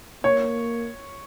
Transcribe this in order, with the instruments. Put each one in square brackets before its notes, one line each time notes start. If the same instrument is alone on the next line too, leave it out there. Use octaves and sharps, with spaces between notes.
[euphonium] A#3 [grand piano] C#5